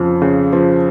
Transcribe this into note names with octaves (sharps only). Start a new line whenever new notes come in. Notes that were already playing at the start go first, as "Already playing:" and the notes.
Already playing: F2 C#3 F3
C#3
F3